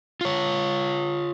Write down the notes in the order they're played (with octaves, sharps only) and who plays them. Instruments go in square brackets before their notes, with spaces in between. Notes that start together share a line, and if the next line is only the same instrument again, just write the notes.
[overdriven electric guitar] F4 C#5